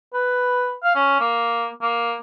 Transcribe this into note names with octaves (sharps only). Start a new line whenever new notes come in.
B4
F5
C#4
A#3
A#3